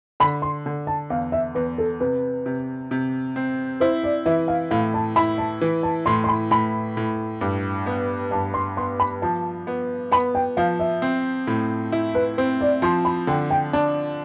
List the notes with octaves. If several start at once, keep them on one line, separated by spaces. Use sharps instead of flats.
D3 B5
C6
D3
A5
E2 F5
E5
E2 B4
A4
C3 B4
C3
C3
C4
E4 C5
D5
E3 E5
F5
A2 F5
A5
E4 B5
A5
E3
A5
A2 C6
C6
B5
A2 B5
A2
G2
B3
G2 A5
C6
B3 C6
B5
F3 A5
B3
B3 B5
G5
F3 F5
E5
C4
A2
E4
B4
C4 C5
D5
F3 C6
B5
D3 G5
G5
D4 A5